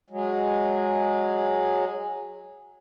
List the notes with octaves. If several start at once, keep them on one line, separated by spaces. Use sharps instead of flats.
F#3 G#3